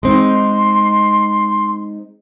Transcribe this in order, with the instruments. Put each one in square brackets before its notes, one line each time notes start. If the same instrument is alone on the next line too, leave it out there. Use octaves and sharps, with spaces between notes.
[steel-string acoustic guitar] G#3 C4 D#4 [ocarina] C6